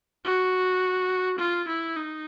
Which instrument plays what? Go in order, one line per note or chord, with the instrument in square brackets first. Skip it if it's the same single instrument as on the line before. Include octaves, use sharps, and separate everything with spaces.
[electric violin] F#4
F4
E4
D#4